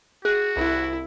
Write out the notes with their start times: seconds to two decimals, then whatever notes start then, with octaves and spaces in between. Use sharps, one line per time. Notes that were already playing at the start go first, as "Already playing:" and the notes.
0.25 F#4 G#4 F#6
0.57 C2 E4